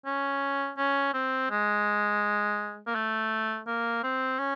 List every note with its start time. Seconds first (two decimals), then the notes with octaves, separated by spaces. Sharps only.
0.06 C#4
0.78 C#4
1.14 C4
1.51 G#3
2.87 A#3
2.95 A3
3.67 A#3
4.04 C4
4.39 C#4